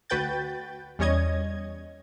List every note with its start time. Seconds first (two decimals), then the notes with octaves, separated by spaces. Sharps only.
0.10 D2 F#4 B4 G5 G6 A6
0.99 E2 G3 C#4 C#5 D#5 G#6